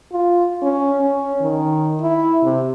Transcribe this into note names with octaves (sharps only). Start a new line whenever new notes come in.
F4
C#4
C#4
D#3
E4
C3